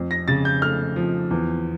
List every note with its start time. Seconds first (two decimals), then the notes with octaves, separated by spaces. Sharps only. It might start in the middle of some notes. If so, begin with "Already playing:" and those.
Already playing: F2
0.11 A#6
0.28 C#3 A6
0.45 G6
0.62 A3 F6
0.96 F3
1.31 E2